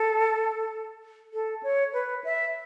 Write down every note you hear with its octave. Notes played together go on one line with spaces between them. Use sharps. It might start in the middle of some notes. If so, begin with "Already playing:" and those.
Already playing: A4
A4
C#5
B4
E5